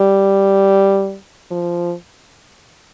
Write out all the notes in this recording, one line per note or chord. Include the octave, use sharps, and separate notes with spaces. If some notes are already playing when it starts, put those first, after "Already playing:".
Already playing: G3
F3